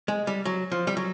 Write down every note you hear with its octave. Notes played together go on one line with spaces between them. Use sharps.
G#3
G3
F#3
F3
G3
F#3